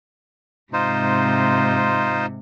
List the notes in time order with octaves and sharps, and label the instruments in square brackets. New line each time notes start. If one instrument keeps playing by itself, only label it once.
[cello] G#2 C3 [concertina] D#4 F4 C5